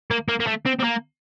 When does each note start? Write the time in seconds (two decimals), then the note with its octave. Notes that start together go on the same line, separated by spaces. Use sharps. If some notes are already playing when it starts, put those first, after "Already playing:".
0.11 A#3
0.29 A#3
0.40 A#3
0.47 A3
0.66 C4
0.80 C4
0.84 A#3